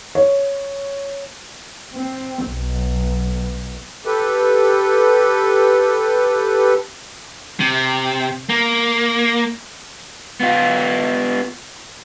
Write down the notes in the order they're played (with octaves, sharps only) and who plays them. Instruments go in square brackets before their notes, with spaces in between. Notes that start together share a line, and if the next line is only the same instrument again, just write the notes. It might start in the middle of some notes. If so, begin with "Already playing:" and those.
[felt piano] C#5
[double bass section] C4
B1
[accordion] G4 A4 B4
[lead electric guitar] C3
A#3
[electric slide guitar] B3 F4